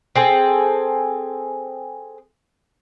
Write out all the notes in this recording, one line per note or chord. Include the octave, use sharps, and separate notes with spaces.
C4 G#4 A4